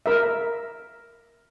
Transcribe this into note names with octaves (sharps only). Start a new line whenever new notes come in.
A#4 E5